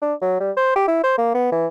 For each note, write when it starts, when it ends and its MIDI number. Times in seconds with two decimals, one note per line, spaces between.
0.02 0.14 62
0.22 0.38 54
0.40 0.51 55
0.57 0.71 72
0.76 0.85 67
0.88 0.99 64
1.04 1.15 72
1.18 1.33 58
1.34 1.51 59
1.52 1.67 52